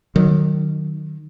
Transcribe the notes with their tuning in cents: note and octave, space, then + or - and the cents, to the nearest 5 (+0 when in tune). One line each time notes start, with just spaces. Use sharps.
D#3 -25 F#3 +0